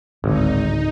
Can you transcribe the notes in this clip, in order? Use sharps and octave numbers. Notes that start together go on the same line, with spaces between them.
D1 G#1 D3 D#4